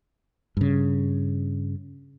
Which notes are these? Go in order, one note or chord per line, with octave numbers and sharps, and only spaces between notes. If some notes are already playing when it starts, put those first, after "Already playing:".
G2 C#3